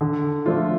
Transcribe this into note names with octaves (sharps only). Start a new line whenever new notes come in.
D3
F3 A3 D4 F4